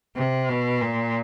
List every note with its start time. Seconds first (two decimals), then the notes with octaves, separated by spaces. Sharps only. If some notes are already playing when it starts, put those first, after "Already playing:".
0.16 C3
0.49 B2
0.81 A#2